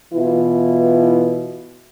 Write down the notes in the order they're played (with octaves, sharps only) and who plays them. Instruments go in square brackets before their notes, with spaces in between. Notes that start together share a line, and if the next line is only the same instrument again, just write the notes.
[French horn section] B2 E3 E4 F4